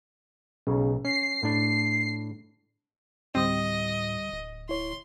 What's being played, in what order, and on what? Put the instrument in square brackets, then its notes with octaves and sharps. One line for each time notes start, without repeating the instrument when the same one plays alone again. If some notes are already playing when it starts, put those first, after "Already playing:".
[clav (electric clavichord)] B1 [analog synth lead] C#3
[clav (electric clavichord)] C#4 [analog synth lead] C7
[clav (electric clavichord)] A2 D4
[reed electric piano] D2 G3 D#6 [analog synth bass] A2 [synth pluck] C4 [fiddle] D#5
[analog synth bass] D1
[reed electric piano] E4 C#5 [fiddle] C6